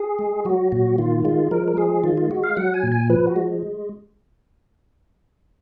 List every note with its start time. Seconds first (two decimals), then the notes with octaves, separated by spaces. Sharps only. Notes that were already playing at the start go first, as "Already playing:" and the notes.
Already playing: G#4
0.19 G#3
0.45 F#3 F#4
0.72 A#2 F#4
0.98 D#3 F4
1.25 G#3 F4
1.51 F3 A#4
1.68 A#4
1.77 G#3 G#4
2.04 D#3 F4
2.17 F4
2.31 G#3 F#4
2.44 F5
2.57 F#3 F#5
2.74 G#5
2.83 A#2
2.92 G#5
3.09 F3 B4
3.27 F#4
3.36 G#3